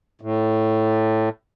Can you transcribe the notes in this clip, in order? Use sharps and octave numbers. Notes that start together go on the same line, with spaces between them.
A2